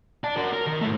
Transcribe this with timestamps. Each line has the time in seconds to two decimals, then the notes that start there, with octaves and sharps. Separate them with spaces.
0.24 D5 A5
0.37 F#4 A#4
0.53 A#4
0.67 D#3
0.81 G#2 A3